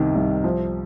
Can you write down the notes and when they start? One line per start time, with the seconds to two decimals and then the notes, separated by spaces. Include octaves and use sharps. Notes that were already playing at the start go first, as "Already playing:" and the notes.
Already playing: C2 C3 D#3
0.15 C2
0.44 F3